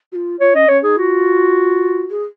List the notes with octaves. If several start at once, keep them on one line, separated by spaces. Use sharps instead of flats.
F#4
F4
F4 C#5
C#4 D#5
C#4 C#5
D#4 G#4
F4 F#4
G#4